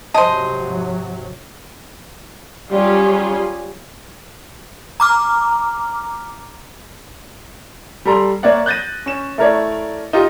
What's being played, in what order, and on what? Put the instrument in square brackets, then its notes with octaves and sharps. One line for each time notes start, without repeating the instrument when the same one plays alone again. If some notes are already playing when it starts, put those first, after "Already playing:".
[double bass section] G#2 C3 F#3 [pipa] G#3 C5 [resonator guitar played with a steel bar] D#5 [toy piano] A5
[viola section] F#3 G3 C#4 F4 G4 G#4
[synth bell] A#5 D6 F6
[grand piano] G3 A4 A#5 C6
A#3 C#5 D5 E5 F#5
F#6 G6 A6 A#6 D#7
C#4 E7
A3 E4 A#4 C#5 D5
D#4 F4 G4